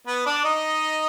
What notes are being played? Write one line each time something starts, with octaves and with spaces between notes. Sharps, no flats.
B3 B4
D4 D5
D#4 D#5